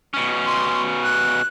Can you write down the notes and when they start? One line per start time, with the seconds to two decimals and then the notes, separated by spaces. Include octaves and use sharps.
0.14 B2 C#4
0.46 C6
1.04 F#6